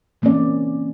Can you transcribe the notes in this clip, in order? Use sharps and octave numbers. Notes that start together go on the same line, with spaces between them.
E3 A#3 C4 C#4 D5